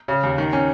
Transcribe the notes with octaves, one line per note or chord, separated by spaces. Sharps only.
C#3
D#2
D#3
C#4